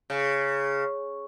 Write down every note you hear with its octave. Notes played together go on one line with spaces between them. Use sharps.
C#3